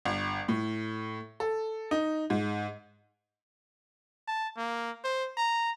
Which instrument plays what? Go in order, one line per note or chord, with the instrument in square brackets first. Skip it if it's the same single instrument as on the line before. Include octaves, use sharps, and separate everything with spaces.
[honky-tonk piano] G1
A2
A4
D#4
G#2
[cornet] A5
A#3
C5
A#5